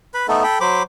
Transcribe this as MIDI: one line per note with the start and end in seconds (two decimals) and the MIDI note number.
0.14 0.27 71
0.14 0.27 83
0.28 0.43 57
0.28 0.43 59
0.28 0.43 63
0.28 0.43 69
0.43 0.58 69
0.43 0.58 79
0.43 0.58 83
0.61 0.83 54
0.61 0.83 72
0.61 0.83 83
0.61 0.83 86